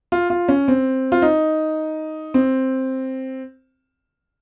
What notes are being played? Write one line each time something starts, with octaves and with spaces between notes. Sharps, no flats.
F4
F4
C#4
C4
F4
D#4
C4